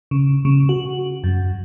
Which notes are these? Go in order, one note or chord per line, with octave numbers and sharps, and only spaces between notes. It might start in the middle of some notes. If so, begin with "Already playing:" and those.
C#3
C#3
F#4
F#2